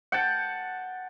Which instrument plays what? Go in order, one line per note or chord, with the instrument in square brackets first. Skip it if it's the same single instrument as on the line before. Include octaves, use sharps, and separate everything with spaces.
[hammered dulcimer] F#5 G5 A5